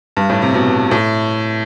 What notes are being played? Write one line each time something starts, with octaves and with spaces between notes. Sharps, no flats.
G2
A2
C3
B2
A2